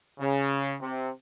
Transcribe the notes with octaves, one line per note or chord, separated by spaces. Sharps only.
C#3
C3